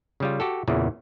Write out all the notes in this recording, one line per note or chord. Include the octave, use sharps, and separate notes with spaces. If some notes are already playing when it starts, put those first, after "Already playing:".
C#3 G3 F4
F#4 G4 A4
E2 A#2 C#3 E3